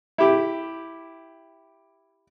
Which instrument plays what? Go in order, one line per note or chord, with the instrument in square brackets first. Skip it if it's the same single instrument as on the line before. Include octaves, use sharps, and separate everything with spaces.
[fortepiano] E4 G4